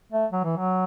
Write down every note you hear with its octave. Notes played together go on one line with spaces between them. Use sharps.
A3
F#3
E3
F#3